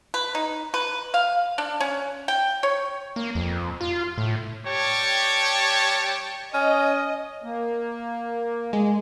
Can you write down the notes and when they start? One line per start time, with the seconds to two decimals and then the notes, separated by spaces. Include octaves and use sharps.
0.14 B4
0.35 D#4
0.74 B4
1.14 F5
1.58 D4
1.80 C#4
2.28 G5
2.63 C#5
3.16 A#3
3.35 F2
3.81 F4
4.18 A2
4.66 G3 G4 C#5 G5 A5
6.54 C#4 D#5
7.43 A#3
8.73 G#3